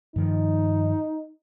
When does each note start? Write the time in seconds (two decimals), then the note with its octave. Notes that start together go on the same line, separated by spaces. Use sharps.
0.16 G2 D#3 F3 D#4